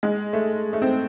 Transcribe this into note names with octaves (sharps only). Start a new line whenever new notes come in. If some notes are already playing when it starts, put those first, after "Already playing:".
G#3
A3
A3
C4